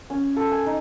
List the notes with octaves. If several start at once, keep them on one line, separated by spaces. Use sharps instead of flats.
C#4
A4
G#5
D#4